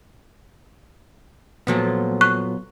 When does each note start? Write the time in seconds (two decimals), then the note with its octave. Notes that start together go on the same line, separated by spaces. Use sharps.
1.67 A#2 F3 F#3 B3 A4
2.21 C#6 F#6